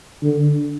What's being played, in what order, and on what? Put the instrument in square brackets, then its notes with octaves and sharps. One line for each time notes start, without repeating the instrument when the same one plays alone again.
[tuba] D3